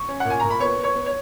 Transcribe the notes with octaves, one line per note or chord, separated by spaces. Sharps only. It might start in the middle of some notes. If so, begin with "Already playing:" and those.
Already playing: C#6
C#4
F#5
A#2 G#5
A#2 A#5
B5
B3 C#5 C#6
B3
C#5 C#6
B3
C#5